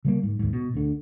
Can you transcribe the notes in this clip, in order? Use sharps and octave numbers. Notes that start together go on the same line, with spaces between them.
C#3 G3 A#3
G#2
D#2 G#2
B2
D2 D3